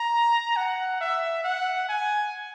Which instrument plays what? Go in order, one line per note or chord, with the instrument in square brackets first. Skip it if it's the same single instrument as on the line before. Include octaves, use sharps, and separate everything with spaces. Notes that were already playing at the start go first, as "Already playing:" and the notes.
Already playing: [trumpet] A#5
F#5
E5
F#5
G#5